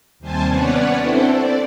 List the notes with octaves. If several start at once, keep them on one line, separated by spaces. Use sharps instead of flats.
D#2 C3 G3 C5 G#5 A5
B3 C#4 B4 C#5 D5 F#5
C4 D4 E4 A4 C5
D5